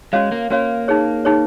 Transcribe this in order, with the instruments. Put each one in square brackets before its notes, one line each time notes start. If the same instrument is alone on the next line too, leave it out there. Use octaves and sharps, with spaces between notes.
[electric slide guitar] G#3 [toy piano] C#4 F#4 C#5 F5
[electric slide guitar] A#3
[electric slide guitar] A#3 [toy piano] C#4 F#4 C#5 F5
[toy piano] D#4 G#4 C#5
D#4 G#4 C#5